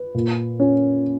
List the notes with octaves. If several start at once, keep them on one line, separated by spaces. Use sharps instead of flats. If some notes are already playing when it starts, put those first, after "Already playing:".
Already playing: B4
A#2
C#4